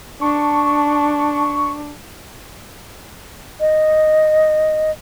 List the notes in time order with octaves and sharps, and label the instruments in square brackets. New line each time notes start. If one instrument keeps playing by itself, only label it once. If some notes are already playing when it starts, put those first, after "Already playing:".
[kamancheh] D4 [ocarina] A5 [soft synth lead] C#6
[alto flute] D#5